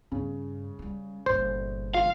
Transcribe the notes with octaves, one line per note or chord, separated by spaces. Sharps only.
G2 C#3
G3 C#4
G1 A#2 C5
F4 F5